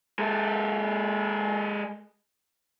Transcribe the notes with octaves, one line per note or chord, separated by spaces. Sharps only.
G#3 A4